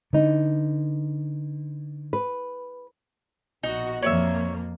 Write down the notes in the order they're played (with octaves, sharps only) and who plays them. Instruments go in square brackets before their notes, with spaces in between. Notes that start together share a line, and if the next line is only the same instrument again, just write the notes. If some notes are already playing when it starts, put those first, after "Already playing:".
[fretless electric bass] D3 [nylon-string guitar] B3 D#4
[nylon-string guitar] B4
[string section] A#1 B2 F#4 [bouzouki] D#4
[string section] F2 A#3 [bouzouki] C#5 D5 E5